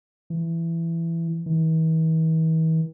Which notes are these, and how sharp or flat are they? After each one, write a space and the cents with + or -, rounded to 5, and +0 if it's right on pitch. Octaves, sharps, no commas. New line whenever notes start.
E3 +15
E3 -45